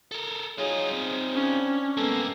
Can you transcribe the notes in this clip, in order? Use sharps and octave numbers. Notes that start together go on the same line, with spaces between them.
A4 A#4
F#3 D#4 F4 G#4 C#5
C4
C#4 D4
G2 G#3 A#3 B3 A4